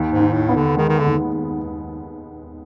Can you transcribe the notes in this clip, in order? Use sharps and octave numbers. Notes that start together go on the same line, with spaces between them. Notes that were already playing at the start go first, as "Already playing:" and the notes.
Already playing: D#2
G#2
D#3
A2
B3
D3
D#3 G#3
D#3
D3
D#2